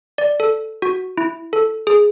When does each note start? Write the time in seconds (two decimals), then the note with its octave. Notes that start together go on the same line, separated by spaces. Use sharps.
0.18 D5
0.40 A4
0.82 F#4
1.18 E4
1.53 A4
1.87 G#4